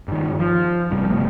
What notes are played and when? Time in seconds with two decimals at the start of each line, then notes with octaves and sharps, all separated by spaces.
0.08 G2 D#3
0.39 F3
0.91 G1 C3 G3
1.11 C3 A3 B3